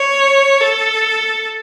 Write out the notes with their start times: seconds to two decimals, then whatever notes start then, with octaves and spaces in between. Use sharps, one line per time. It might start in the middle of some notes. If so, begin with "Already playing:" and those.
Already playing: C#5
0.61 A4